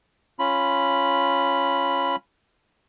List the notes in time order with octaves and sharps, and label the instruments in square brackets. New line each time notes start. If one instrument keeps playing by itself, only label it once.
[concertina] C#4 F4 B5